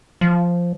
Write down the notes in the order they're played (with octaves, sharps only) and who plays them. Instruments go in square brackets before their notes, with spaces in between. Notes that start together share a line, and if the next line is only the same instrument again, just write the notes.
[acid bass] F3